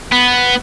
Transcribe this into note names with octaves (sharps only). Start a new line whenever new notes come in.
B3